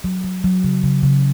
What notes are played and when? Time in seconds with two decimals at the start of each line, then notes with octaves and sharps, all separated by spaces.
0.04 F#3
0.24 F#3
0.44 F#3
0.64 C#3
0.84 C#3
1.03 C#3